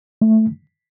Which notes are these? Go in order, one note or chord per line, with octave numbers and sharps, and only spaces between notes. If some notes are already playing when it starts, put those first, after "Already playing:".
A3